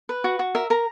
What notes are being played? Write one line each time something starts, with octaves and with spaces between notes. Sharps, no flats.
B4
F#4
F#4
A#4 E5
A#4 A#5